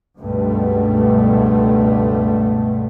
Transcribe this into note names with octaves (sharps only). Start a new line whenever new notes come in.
C#2 G2 B2 A3